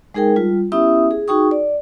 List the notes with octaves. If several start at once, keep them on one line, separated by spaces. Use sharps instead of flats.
G#3 D#4 G#4 A#4 G5
G3 F4
B3 C#4 E4 G4 E5 D#6
G#4
D#4 F#4 G#4 G5 C#6 D#6
D5